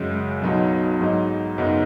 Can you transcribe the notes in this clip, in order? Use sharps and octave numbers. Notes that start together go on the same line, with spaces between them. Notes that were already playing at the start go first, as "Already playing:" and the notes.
Already playing: F#2 C#3 G#3
B1 B2 F#3 D#4
G#2 F#3 D#4
F#2 C#3 B3 D#4